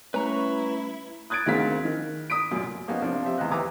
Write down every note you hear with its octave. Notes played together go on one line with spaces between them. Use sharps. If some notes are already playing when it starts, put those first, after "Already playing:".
G3 A3 C#4 E4 B4 A#5 C#6
D#6 F#6 G#6 A6 D7
D2 D#3 C4 G#4 F5 B6
D#3
D#6 B6 D7
F1 F#2 A#2
F3 A#3 B3 C#4 D#4
C3 F3 A#3 C4 D4
F3 C4 G4 E5
E2 A2 D#5 F#6
D#2 E3 G4 A#5 D6 D#6